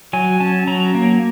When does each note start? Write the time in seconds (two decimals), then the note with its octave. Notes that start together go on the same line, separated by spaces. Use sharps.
0.13 F#3 G#5
0.40 C#4 A5
0.67 F#3 A#5
0.95 A#3